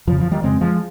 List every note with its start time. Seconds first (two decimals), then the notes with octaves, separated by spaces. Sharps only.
0.07 F2 C#3 F3
0.20 F3
0.31 D#3 G3
0.43 F2 C#3 G#3 C4
0.61 F3 G#3